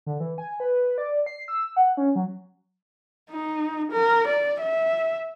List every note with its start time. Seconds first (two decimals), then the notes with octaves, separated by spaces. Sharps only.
0.06 D3
0.20 E3
0.38 G#5
0.60 B4
0.98 D5
1.26 C7
1.48 E6
1.76 F#5
1.97 C#4
2.16 F#3
3.31 D#4
3.92 A#4
4.27 D5
4.61 E5